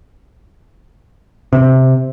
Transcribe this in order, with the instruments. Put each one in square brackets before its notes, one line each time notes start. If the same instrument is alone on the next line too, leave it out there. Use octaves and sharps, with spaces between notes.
[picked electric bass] C3